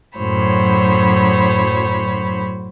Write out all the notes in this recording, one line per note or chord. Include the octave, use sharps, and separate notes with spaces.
F#2 A2 F#3 C5 C#5 B5